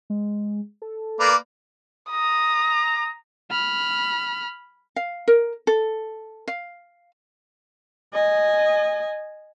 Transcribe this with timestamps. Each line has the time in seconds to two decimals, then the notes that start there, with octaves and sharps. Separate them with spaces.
0.10 G#3
0.82 A4
1.20 A#3 B4 D5
2.10 A#5 D#6
3.51 B5 F6
4.96 F5
5.28 A#4
5.67 A4
6.48 F5
8.14 D#5 G#5